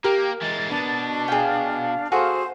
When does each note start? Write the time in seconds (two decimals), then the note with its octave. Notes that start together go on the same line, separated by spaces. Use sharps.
0.04 A#3 G4 A#4
0.41 E3 G#3 A6
0.70 B2 D4
1.28 G#4 F5 G5
2.12 F#4 G#4 A4 C5